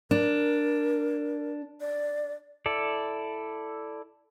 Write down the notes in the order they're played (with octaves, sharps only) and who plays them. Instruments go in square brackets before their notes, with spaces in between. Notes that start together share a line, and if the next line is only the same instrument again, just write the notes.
[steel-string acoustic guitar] D4 [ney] A#4
[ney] D5
[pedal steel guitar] E4 A4 D5